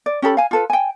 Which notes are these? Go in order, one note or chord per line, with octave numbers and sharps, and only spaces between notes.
D5
C#4 G4 A4 B5
F5 G#5
F4 A4 B4
G5 G#5